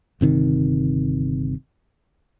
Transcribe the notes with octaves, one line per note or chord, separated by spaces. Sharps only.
G1 C3 D#3